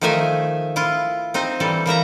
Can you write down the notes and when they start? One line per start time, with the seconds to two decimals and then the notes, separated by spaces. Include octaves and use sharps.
0.01 D#3 F3 A3 D#4 E5 G#5
0.76 E4 F4
1.34 C4 D#4 C5
1.60 E3 G3 A4
1.86 E3 A#3 E5 A#5